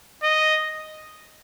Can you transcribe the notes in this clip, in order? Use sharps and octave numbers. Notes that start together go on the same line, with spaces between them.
D#5